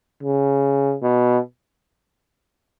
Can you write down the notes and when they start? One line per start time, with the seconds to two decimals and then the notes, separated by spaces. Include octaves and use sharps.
0.23 C#3
1.03 B2